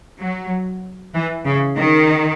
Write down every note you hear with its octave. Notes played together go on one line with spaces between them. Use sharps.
F#3
E3
C#3
D#3